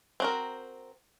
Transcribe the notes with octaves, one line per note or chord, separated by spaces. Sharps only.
C4 F#4 A#4